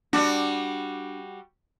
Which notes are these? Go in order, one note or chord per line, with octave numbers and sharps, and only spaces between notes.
G3 D4 F#4